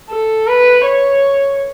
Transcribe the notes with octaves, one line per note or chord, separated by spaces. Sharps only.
A4
B4
C#5